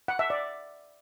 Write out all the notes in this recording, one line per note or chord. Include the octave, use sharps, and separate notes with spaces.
F#5
E5
D5